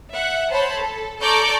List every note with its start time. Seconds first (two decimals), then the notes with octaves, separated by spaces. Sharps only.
0.13 E5 F#5
0.51 C5 C#5 A5 B5
0.81 A4
1.20 A4 D5 A#5 C#6 D6 G6